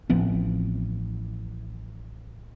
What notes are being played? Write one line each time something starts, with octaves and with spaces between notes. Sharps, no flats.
A1 F3 B3 C4